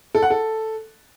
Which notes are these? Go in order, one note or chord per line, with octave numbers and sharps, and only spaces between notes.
A4
F#5
A4